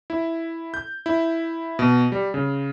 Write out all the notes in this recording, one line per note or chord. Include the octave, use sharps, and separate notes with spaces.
E4
G6
E4
B2
G3
C#3